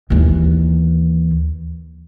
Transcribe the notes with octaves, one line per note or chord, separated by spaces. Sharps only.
D#2 E3